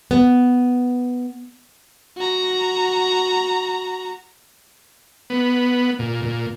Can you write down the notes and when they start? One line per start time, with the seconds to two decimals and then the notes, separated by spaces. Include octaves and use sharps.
0.11 B3
2.17 F#4 A#5
5.30 B3
5.99 A#2
6.23 A#2